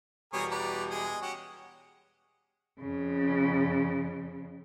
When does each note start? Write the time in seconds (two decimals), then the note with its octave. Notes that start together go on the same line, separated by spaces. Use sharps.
0.33 E2 B2 G3 G#4 A#4 C#5
0.51 B4 D5 A#5
0.91 G#3 G#4 D#5
1.22 C#4 F#4 G4
2.81 F2 C#3